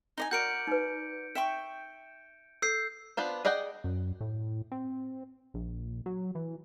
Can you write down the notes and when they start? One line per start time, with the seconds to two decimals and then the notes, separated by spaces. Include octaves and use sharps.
0.18 D#4 D#5 G#5
0.31 F#4 A#4 D5 G6 C#7 D7
0.67 D#4 B4
1.35 E5 G5 C#6
2.62 A4 E6 G6 C7
3.17 B3 D4 F4 C5
3.45 G#4 D5 D#5 F#5 G5
3.84 F#2
4.21 A2
4.72 C4
5.54 A#1
6.06 F#3
6.35 E3